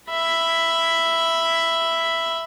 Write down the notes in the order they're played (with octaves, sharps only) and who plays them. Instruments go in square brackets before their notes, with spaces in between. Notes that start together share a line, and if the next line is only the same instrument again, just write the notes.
[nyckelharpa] E5 B5